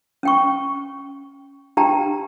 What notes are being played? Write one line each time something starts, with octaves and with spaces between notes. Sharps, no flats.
C#4 G5 C#6
D4 G4 G5 A5 A#5